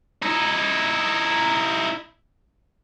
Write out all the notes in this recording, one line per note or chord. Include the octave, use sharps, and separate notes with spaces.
D#4 E4